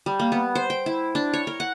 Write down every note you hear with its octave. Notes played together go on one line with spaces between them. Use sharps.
G3
A#3
B3
C5
G5
E4
D4
C#5
A#4
F#5